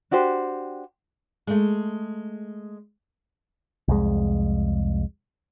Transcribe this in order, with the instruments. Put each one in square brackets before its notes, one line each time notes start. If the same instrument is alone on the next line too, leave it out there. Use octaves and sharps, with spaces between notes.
[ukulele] D4 F#4 G4 C5
[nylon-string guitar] G#3 A3
[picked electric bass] C2 F2 G#3